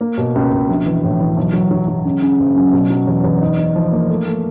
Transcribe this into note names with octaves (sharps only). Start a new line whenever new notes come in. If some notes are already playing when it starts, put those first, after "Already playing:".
A#3
B2
C#2
B2
A#1
E3
A2
E3
B1
F#3
F#3
F#3
C#3
C#3
F#1
F#2
B2
F#3
E2
E2
D#4
D#4
F3
A#3
A3
A3